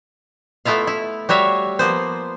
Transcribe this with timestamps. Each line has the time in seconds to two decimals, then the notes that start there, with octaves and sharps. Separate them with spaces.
0.65 A3 B3 E4 F4 F5
0.87 E4
1.29 G3 F#4 C#5 E5 F5
1.79 F3 A#3 B3 C5